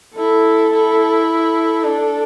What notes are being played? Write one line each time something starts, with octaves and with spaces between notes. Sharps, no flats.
E4 A4
E4
A4
D4